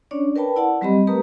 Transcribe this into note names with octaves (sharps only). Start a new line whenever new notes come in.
C#4 D4 C#5 D5
A#4 B4 D5 G5 A5 B5
E4 D5 F#5 A5
F#3 G3 C4 G4 D#5 B5
A3 G4 A#4 B4 A#5 D#6